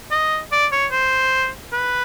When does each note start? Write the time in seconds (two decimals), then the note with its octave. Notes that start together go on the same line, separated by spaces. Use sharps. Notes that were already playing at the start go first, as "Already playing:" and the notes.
0.11 D#5
0.52 D5
0.72 C#5
0.92 C5
1.73 B4